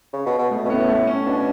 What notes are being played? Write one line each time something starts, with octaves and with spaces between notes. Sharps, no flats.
C#3
B2
B2
A3
B2 C#4
A2 B3
A3
C#4
B2 D4